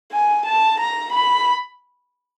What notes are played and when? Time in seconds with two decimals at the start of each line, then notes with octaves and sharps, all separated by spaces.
0.13 G#5
0.46 A5
0.80 A#5
1.13 B5